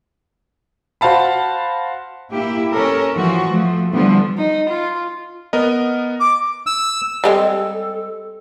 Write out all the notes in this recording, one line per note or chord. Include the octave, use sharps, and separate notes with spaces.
F#4 C5 F5 A5 B5
A#3 E4 G4
C#4 A4 A#4
E3 F3 F#4
F3 A3
D3 E3 F3 G3 B3
D#4
F4
B3 A#4 D#5
D6
E6
G3 G#3 C4 A4